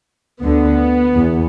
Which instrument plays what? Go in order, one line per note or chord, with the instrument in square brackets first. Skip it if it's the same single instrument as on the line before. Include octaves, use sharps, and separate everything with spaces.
[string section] D2 D3 B3
E2